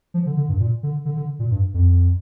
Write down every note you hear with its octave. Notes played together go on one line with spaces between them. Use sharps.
F3
D3
D3
G2
A#2
D3
D3
D3
A#2
G2
F2